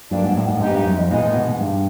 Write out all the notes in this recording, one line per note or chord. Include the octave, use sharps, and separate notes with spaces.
G2 F#3 A#3 D4
G#2
A2
G#2
A2
G#2 F#3 B3 D#4 G4
G2
F#2
F2
A#2 E3 G#3 B3 D#4
A2
B2
G#2
G2